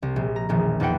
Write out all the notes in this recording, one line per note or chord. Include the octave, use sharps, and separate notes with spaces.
C2
A#1
A#5
E1 A#1 D#3
E2 D#4 F4 B4 F#5 G5